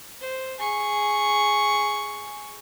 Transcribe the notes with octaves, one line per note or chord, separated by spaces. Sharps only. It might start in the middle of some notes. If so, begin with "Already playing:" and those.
C5
G#4 C#6